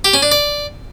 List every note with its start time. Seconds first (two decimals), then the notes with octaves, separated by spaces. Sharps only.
0.05 G4
0.14 C#4
0.22 D4
0.31 D5